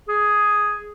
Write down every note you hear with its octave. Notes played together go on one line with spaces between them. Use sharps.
G#4